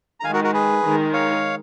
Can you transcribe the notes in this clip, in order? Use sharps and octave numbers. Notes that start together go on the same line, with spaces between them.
A#5
D#3 G#3 D#4 F5 G#5
F#4 A#4
F#4 A#4
G#4 B4
D#3 G#3 D#4 A#4
C#5 F5